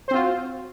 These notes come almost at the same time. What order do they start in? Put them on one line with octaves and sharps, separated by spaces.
C5 C4 F4 F#4